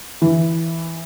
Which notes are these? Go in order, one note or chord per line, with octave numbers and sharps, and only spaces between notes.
E3